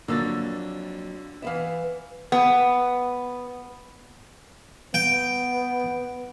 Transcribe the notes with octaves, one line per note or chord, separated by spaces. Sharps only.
F2 D3 F#3 A#3 E6 A6
E3 B3 B4 E5 F5
B3
B3 G5